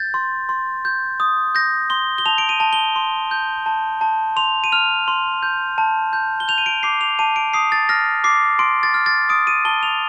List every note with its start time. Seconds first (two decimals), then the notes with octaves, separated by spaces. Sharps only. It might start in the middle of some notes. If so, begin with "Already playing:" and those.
Already playing: G6 A6
0.14 C6
0.49 C6
0.85 G6
1.20 D#6
1.55 G6 A#6
1.90 C6 G7
2.18 G7
2.26 A5 F7
2.38 D7
2.49 D#7
2.60 A5
2.73 G7
2.96 C6
3.31 G6
3.66 A5
4.01 A5
4.36 C6 F7
4.64 D#7
4.72 F6 F7
5.08 C6
5.43 G6
5.78 A5
6.13 G6
6.40 G7
6.48 G6 F7
6.58 D#7
6.66 D7
6.83 D6 C7
7.01 F7
7.19 A5 D#7
7.36 D7
7.53 D#6 C7
7.72 A6
7.89 F6 A#6
8.24 D6 C7
8.59 C6 D7
8.83 A6
8.94 F6
9.06 A6
9.29 D#6 D7
9.47 D#7
9.65 A5 G7
9.83 F7